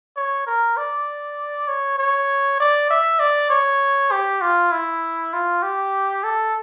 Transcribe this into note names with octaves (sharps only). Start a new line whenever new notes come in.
C#5
A#4
D5
C#5
C#5
D5
E5
D5
C#5
G4
F4
E4
F4
G4
A4